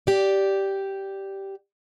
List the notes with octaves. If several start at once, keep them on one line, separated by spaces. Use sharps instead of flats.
G4 D5